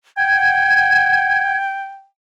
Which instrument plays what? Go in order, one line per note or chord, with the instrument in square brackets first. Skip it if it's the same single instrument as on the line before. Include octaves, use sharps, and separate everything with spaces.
[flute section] F#5 G#6 [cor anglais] G5